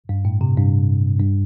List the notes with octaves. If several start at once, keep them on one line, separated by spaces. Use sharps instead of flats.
G2
A2
C3
G2
G2